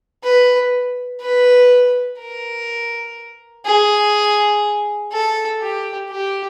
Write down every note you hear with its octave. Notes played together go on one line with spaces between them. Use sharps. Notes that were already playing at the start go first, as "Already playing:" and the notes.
B4
B4
A#4
G#4
A4
G4
G4